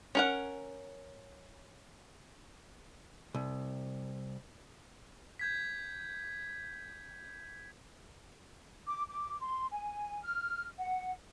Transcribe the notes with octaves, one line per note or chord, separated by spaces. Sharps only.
C#4 A#4 F#5
C2
G6 G#6 B6
D6
D6
C6
G#5
F6
F#5